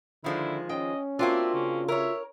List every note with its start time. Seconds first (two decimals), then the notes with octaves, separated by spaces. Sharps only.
0.24 D3 D#3 F3 G#3 E4
0.69 C#4 D#5 G5
1.19 A#3 C4 D4 F4 F#4 E5
1.54 C#3 C#4
1.88 A#4 C#5 E5